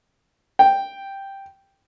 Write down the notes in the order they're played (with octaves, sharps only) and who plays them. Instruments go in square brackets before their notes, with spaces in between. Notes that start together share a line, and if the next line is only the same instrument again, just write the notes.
[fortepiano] G5